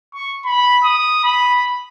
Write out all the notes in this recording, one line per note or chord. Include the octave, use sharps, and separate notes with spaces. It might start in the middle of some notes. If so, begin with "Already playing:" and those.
C#6
B5
D#6
B5